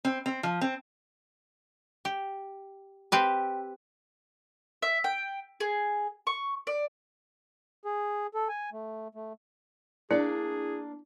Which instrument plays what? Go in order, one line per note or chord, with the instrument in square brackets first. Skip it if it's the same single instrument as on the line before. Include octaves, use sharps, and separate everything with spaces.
[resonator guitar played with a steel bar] C4
C4
F3
C4
[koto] G4
C4 G4 B4
[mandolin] E5
G5
G#4
C#6
D5
[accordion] G#4
A4
G#5
A3
A3
[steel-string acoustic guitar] A#3 D4 [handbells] E4 [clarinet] G#4 [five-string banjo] D5